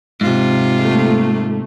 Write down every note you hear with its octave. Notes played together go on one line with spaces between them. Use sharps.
G#2 C3 F4
A3 A#3